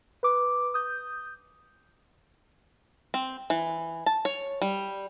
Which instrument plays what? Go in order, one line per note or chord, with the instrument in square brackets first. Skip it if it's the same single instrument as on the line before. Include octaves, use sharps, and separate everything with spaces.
[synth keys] B4 D6
D#6 G6
[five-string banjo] C4
E3
A5
C#5
G3